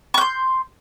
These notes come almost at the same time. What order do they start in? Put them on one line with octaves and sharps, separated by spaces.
C#6 G6 C6